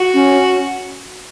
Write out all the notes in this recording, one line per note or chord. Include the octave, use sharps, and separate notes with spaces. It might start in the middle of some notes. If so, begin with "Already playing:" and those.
Already playing: F#4
C#4